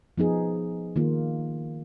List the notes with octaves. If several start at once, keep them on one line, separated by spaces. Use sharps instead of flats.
F3 B3 D#4 G#4
D#3 A#3 F4